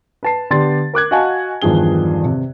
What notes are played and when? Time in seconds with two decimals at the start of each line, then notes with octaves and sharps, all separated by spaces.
0.23 B4 A5 C7
0.50 D3 B3 G4 D5 C6 A6
0.94 A#4 D6 F#6 G#6
1.11 F#4 D#5 F5 F#5 G#5 A5
1.62 E2 G2 D#3 F3 G#4 G7
2.25 C3